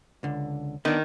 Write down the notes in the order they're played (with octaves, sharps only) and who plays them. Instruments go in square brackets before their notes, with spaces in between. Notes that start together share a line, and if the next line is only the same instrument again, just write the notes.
[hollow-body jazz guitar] C#2 D3
[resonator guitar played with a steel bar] D#3 [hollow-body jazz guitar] B3 D4